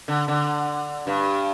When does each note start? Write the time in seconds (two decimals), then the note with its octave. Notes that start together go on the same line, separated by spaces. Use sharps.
0.08 D3
0.28 D3
1.07 G2